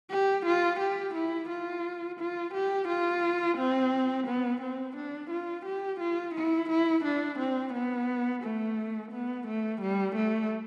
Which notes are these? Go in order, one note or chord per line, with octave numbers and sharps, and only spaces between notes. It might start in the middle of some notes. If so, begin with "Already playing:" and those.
G4
F4
G4
E4
F4
F4
G4
F4
C4
B3
C4
D4
F4
G4
F4
E4
E4
D4
C4
B3
A3
B3
A3
G3
A3